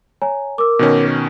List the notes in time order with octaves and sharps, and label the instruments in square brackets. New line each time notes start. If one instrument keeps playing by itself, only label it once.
[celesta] C#5 G#5 A#5
[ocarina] A#4 [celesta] D6 E6
[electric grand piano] B2 D#3 C#4